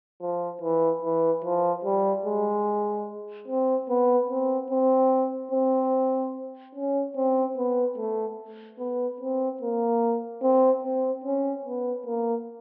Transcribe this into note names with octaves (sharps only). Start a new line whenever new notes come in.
F3
E3
E3
F3
G3
G#3
C4
B3
C4
C4
C4
C#4
C4
B3
A3
B3
C4
A#3
C4
C4
C#4
B3
A#3